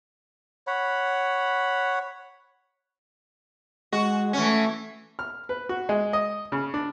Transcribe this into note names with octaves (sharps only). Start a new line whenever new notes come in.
C#5 F#5 B5
G#3 F#4
E3 A3 C#4 C#6
F6
B4
F#4
G#3
D#5
C#3
D4